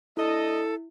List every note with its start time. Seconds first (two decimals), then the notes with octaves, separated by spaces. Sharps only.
0.17 A3 D4 E4 A4 D#5